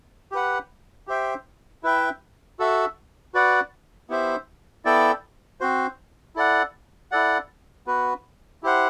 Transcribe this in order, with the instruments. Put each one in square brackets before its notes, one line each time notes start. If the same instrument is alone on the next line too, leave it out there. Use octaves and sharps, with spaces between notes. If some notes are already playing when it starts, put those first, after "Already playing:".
[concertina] G4 B4 F#5
G4 C5 E5 G5
E4 B4 E5 G5
F#4 A4 E5
F#4 B4 D5 F#5
B3 E4 G4 C5 E5
B3 E4 A4 D5 G5
C4 F#4 C5
E4 A4 D5 F#5
E4 A4 D5 F#5
B3 F#4 B4
E4 G4 C5 F#5